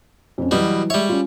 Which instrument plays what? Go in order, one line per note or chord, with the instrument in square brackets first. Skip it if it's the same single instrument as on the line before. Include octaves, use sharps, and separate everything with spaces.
[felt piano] F2 C#4
[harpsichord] B2 G3 [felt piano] E3 F#3 E4
[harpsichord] G3 C#5 [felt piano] G#3 E5
[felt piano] C#4 F4